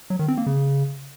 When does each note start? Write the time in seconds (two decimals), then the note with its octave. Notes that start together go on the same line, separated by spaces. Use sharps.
0.10 F#3
0.19 D#3
0.28 C4
0.37 A#3
0.47 C#3